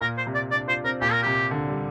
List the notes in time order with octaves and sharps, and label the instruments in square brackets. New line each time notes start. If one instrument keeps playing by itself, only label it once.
[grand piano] A#2 [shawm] A#4
[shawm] C5
[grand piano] C3
[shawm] D5
[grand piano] D4 [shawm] D5
[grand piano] F4 [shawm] C5
[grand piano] C4 [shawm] A#4
[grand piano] A#2 [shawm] G4
[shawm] A#4
[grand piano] C3 [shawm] G4
[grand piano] D3
G3